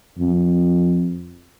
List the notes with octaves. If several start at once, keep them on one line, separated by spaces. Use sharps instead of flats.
F2